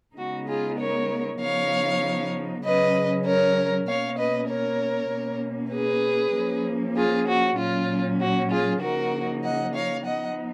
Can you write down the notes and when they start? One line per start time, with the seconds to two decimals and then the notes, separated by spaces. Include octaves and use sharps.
0.16 C#3 G#3 B3 D#4 F#4
0.48 F4 G#4
0.79 A#4 C#5
1.40 C#3 F3 B3 D#4 C#5 F5
2.64 C#3 F#3 C#4 B4 D#5
3.25 A#4 C#5
3.87 B2 A#3 C#4 C#5 F5
4.18 B4 D#5
4.49 A#4 C#5
5.11 B2 A#3 C#4
5.72 G#4 B4
6.34 F3 A#3 C#4
6.96 F4 G#4
7.27 F#4
7.58 A#2 F#3 C#4 F4
8.20 F#4
8.50 F4 G#4
8.81 C#3 F3 A#3 D#4 F#4 A#4
9.43 D#5 F#5
9.73 C#5 F5
10.05 F3 B3 D#4 D#5 F#5